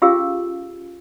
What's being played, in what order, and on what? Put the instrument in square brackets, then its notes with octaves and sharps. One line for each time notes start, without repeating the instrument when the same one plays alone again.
[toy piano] C#4 F4 G4 G#4 F5 E6